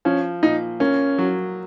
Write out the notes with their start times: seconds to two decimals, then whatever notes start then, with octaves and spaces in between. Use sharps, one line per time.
0.05 F3 C#4
0.43 A#2 D#4
0.80 A#3 C#4
1.18 F#3